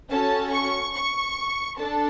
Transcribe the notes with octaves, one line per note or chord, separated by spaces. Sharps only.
C#4 F#4 A4 A5
C#6
C#6
D4 A4 A5